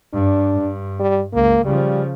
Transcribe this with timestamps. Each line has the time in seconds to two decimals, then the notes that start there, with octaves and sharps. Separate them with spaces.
0.13 G2 D4
0.54 G2
1.00 G3
1.34 C#2 A#3
1.65 C#3 F3 G3